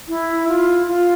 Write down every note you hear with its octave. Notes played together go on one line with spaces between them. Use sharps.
E4
F4
F4